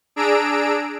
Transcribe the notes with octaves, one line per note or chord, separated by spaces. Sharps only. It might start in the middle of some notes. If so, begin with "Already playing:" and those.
D4 G#4 A#5 E6 D7